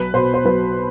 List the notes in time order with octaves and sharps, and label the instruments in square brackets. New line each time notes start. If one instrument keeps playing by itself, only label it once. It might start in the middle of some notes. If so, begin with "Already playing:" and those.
Already playing: [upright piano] B1 B4
B2 C5
C5
B1 B4